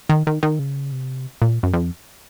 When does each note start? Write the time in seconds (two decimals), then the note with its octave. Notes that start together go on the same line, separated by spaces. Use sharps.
0.09 D#3
0.27 D#3
0.43 D#3
0.59 C#3
0.92 C3
1.42 A#2
1.63 F#2
1.74 F2